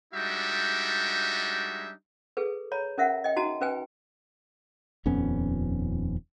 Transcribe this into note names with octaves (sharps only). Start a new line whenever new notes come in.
G3 G#3 D4 D#4 F#4 E5
G#4 A4 B4
C#5 A#5 B5
C#4 A#4 E5 F#5
D#5 G5
D#4 F#4 A5 A#5
C#4 B4 G5 G#5
D#1 F2 B3 C#4